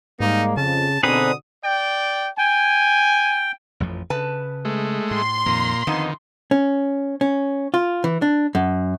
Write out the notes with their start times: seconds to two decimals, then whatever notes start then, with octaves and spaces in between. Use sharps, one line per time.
0.20 G#2 G3 G#3 A#3 D#4
0.57 F2 C#3 A5
1.03 B2 D3 C4 D#4 G#4 B4 D#6
1.64 D5 G5
2.38 G5 G#5
3.80 A1 F2 F3
4.10 C#3 B4 A5
4.65 G#3 A3
5.11 A2 C6
5.46 F2 A#2 D#3 A#5
5.87 F2 D3 D#3 B3 D#4
6.51 C#4
7.21 C#4
7.74 F4
8.04 E3
8.22 D4
8.55 F#2